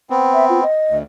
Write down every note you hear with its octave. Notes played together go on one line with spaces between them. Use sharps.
B3 C4
E5
F4
D#5
D2